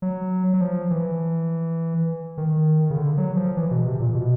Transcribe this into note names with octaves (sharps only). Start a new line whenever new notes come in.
F#3
F#3
F3
E3
D#3
C#3
D3
F#3
F3
E3
B2
C3
A#2
B2